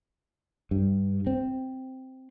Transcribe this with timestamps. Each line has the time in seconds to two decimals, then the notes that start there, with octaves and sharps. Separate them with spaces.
0.71 G2
1.27 C4